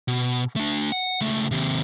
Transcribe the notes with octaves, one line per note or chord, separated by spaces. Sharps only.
B2
A3 D4
F#5
C#2 A3
D#2 C3